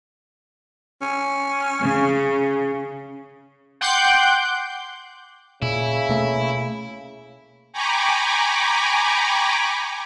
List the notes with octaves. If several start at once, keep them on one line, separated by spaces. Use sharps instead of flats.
C#4
C#3
F#5 G5 C6 D6 F#6 G6
A#2 C#3 E4
B2 A3 A#3
G5 G#5 A#5 B5 C#6 D6